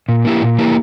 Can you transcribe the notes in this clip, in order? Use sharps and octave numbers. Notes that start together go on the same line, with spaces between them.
A#2
A#3 E4 G4
A#2
A#3 E4 G4